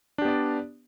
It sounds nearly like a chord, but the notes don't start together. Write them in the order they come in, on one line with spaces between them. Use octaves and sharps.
D4 G4 B3 D5